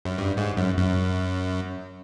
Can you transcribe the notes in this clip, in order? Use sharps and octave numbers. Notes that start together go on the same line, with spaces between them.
F#2
G2
G#2
F#2
F#2